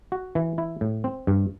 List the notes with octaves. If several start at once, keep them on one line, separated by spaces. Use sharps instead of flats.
F#4
E3
E4
A2
C4
G2